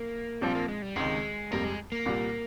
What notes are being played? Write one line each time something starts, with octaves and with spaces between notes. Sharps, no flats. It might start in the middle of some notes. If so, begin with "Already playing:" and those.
Already playing: A#3
A#1 A#2 F3 G3 C4 F4
A#3
G#3
G3
C#2 C3 D#3 G#3
F1 F2 C3 G3 A#3
G#3
A#3
C2 A#2 G3